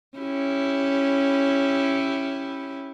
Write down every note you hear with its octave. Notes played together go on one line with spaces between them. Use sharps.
C#4 E4 G4